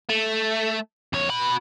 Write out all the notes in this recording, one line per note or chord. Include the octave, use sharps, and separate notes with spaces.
A3
F2 C#5
F#4 B5